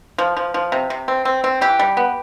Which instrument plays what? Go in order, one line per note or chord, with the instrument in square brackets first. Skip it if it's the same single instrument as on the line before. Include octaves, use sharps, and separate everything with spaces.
[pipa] F3
F3
F3
C3
C3
C4
C4
C4
E3 G4
G3
B3